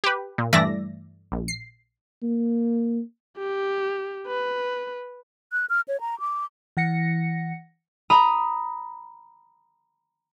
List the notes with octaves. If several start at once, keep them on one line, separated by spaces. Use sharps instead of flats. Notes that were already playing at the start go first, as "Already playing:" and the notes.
G4 B4
A#2
G2 E3 A3 D5 E5 A#6
A#1
C7
A#3
G4
B4
F#6
F6
C#5
A#5
D6
E3 F#5 A#6 C#7
A#5 B5 D#6 D#7